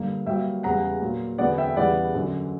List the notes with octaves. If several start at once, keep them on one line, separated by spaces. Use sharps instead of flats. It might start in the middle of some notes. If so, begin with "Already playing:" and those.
Already playing: G2 D3 A#3
G2 F#3 A#3 E5 G5
E2 C#3 G3 F#5 A#5
A#2 F#3 A#3
E2 D3 F#3 B3 D5 F#5
E5 G5
E2 C#3 E3 G3 B3 D5 F#5
F#2 D3 F#3